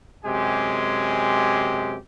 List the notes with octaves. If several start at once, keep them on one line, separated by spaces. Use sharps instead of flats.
F#2 C3 G#3 G4 G#5